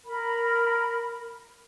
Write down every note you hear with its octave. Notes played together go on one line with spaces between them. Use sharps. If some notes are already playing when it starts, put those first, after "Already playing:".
A#4 B5